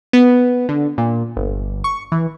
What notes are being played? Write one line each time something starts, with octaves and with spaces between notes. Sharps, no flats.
B3
D3
A#2
G1
C#6
E3